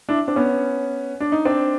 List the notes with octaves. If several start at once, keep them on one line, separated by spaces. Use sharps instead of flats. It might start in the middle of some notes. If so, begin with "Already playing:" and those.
D4 E4
C4 D4
B3 C#4
D4
D#4
C4 D4